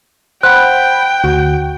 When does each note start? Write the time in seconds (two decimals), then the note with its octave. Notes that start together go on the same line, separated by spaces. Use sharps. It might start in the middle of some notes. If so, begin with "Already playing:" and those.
0.43 C5 F#5 G5 B5 F#6
1.24 D2 F#4